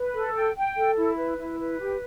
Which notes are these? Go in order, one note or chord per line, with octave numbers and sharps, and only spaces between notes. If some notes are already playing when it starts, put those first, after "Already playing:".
Already playing: B4
A4
G5
G5
A4
E4
B4
E4
B4
G4